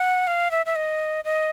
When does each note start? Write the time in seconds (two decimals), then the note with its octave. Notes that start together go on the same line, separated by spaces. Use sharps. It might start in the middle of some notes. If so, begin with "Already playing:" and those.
Already playing: F#5
0.27 F5
0.51 E5
0.66 E5
0.76 D#5
1.25 D#5